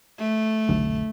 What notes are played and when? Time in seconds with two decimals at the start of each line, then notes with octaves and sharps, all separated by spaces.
0.18 A3
0.69 F1 B1 D3